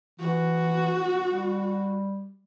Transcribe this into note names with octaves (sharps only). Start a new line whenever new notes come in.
E3 F#4
G3